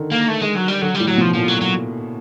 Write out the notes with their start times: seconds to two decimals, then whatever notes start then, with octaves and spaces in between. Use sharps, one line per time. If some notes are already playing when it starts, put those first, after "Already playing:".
Already playing: D3 D#3
0.12 A#3
0.28 A3
0.42 G#3
0.55 F#3
0.68 G3
0.82 D3 F#3
0.95 A2 G3
1.08 F#3
1.17 B2
1.22 F3
1.34 A#2 F3
1.48 F#3
1.61 F#3